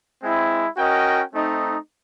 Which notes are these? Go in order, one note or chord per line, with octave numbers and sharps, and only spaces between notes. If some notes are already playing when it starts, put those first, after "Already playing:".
G#3 C4 E4
C#4 F#4 A#4 D#5 G5
A3 C4 D#4